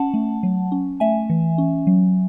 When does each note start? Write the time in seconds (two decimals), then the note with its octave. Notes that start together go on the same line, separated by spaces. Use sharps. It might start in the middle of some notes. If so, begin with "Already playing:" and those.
Already playing: C#4 F#5 A5
0.14 A3
0.43 F#3
0.72 C#4
1.00 A3 E5 G#5
1.30 E3
1.58 C#4
1.87 F#3